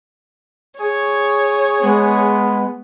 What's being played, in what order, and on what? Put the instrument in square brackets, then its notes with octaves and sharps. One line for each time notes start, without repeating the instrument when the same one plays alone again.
[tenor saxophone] G#4 [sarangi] C#5
[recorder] G#3 [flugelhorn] B3